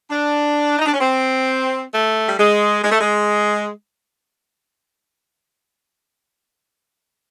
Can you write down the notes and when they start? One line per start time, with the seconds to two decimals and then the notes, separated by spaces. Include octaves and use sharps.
0.10 D4
0.79 D#4
0.86 D4
0.94 C#4
1.01 C4
1.93 A3
2.27 G3
2.38 G#3
2.84 G#3
2.92 A3
3.01 G#3